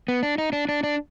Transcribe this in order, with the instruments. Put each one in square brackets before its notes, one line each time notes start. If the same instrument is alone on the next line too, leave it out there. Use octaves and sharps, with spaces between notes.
[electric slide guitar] B3
D4
D#4
D4
D4
D4